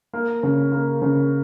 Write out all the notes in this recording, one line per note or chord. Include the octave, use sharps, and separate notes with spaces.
A#3
C#3
A#3
C#3